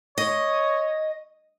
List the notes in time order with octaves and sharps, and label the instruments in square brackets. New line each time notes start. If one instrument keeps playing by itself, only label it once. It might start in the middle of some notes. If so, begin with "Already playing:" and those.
[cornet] C#5 [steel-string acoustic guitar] D#5